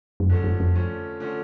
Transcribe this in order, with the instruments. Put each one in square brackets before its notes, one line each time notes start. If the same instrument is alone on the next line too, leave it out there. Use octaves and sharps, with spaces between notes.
[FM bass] F#2
[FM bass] F2 [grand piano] D3 F3 A3 C#4
[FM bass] F#2
F2
[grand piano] D3 F3 A3 C#4
D3 F3 A3 C#4